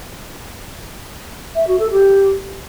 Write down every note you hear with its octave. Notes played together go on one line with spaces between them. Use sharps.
E5
F#4
A4
G4